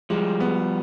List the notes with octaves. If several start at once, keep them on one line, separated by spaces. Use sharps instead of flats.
F3 G3 G#3
B3